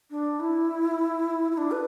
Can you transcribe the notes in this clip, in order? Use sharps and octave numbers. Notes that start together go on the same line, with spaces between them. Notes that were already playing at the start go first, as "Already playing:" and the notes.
D4
E4
E4
D4
B4